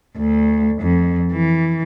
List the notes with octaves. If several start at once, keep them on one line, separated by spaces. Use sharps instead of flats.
D2
F2
E3